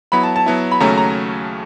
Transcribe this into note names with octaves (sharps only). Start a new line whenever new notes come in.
F#3 B3 E4 B5
A5
A5
F#3 B3 E4
B5
D#2 C#3 F#3 A3 C#4 A#5
A#5